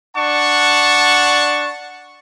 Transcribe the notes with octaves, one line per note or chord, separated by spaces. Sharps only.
D4 F#5 A5 C#6